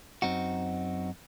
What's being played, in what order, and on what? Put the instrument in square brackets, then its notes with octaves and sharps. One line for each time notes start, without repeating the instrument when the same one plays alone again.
[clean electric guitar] F#2 C4 D#4 F#4